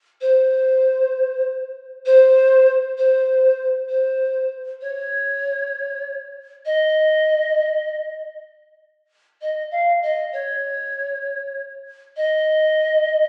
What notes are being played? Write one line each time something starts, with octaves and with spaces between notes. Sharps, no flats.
C5
C5
C5
C5
C#5
D#5
D#5
F5
D#5
C#5
D#5